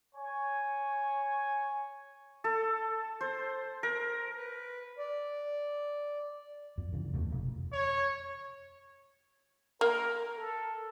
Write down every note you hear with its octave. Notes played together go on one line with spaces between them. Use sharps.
C#5 G#5
A4
C5
A#4
B4
D5
F2
F2 C#3 E3
D#2 B2 A3
F1
C#5
A#3 A#4
A4